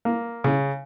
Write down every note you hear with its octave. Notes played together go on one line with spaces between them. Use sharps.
A#3
C#3